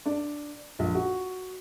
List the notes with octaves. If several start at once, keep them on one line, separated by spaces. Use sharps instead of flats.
D4
A#1
F#4